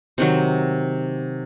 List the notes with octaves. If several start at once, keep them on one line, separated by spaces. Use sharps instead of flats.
C3 D#3 F#3